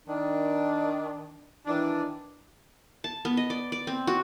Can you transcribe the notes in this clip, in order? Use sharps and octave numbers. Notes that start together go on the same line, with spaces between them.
D#3 D4
D#3 E3 D4
A5
B3
D#5
D5
D5
C4
F#4